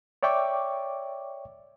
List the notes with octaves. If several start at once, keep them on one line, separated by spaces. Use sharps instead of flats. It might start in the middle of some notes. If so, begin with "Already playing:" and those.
C#5 D5 E5 G5 C#6 D6